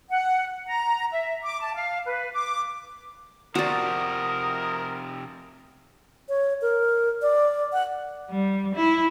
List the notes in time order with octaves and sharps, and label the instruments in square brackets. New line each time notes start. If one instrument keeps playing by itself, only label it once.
[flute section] F#5
A#5
E5
D6
A5
F5
B4
D6
[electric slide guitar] C3 F3 [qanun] F#4 D5 [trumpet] A#4 [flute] D#6
[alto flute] C#5
A#4
D5
F#5
[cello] G3
E4